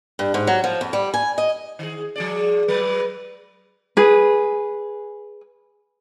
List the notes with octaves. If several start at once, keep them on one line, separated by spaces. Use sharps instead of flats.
G2
G#2
F#3
F3
F2
G3
G#5
D#5
D#3 G#4
F3 G#4 D5
F#3 G#3 B4
G#4 B4